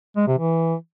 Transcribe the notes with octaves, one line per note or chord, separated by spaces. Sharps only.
G#3
C3
E3